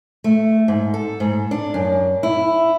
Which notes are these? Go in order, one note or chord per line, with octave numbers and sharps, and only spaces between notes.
A3
G#2
A4
G#2
D4
F#2
E4